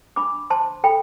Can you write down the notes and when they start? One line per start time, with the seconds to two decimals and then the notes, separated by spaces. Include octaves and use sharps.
0.16 D4 B5 D6
0.50 C5 A5 C6
0.84 A4 G5 B5